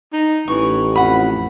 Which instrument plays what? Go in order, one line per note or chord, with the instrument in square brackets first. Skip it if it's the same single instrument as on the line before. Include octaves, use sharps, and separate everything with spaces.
[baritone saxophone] D#4
[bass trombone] A1 [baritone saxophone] E3 [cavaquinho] C#6
[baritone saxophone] F2 [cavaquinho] F#5 B5